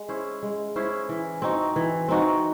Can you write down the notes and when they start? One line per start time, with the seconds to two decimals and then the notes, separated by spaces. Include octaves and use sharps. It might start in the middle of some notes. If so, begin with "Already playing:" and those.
Already playing: G#3
0.09 C#4 E4 C5
0.43 G#3
0.76 C#4 E4 C5
1.09 E3
1.42 C4 D#4 F#4
1.76 E3
2.08 C4 D#4 F#4